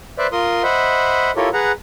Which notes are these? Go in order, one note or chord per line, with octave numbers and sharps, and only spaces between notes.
B4 C5 D5 E5
F4 A#4 C6 D#6
C5 D#5 E5 F#5 B5
E4 F4 G4 A4 A#4 C#5
G#4 B4 F#5 A#5